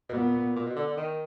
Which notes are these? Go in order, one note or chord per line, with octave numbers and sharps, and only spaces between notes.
B2
A#2 B3
A#2
B2
D3
D3
D#3